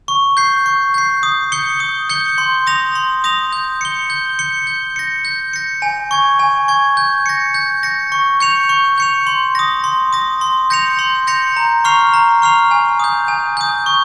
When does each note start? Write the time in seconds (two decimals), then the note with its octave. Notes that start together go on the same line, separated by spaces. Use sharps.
0.08 C#6
0.37 G6 C7
0.66 C#6
0.94 G6 C7
1.23 D#6
1.52 G6 C#7 G7
1.80 D#6
2.10 G6 C#7 G7
2.38 C6
2.67 D#6 A#6 F7
2.95 C6
3.24 D#6 A#6 F7
3.53 G6
3.81 C#7 G7
4.10 G6
4.39 C#7 G7
4.67 G6
4.96 A#6 C#7
5.25 G6
5.53 A#6 C#7
5.82 G#5
6.11 C#6 G#6
6.39 G#5
6.68 C#6 G#6
6.97 G6
7.26 A#6 C#7
7.54 G6
7.83 A#6 C#7
8.12 C#6
8.40 G6 C#7 F7
8.69 C#6
8.98 G6 C#7 F7
9.27 C6
9.55 D#6 A#6
9.84 C6
10.13 D#6 A#6
10.41 C6
10.70 G6 A#6 C#7 F7
10.99 C6
11.27 G6 A#6 C#7 F7
11.57 A#5
11.85 C#6 F6 C7 F7
12.13 A#5
12.42 C#6 F6 C7 F7
12.71 G#5
12.99 D#6 G6
13.28 G#5
13.57 D#6 G6
13.86 C#6